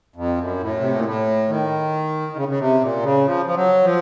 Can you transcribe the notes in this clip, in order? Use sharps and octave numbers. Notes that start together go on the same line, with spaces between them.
F2
F#2
A2
C3
A#2
A2
D#3
D#3
C#3
C#3
C3
A#2
C#3
F3
F3
F#3
F3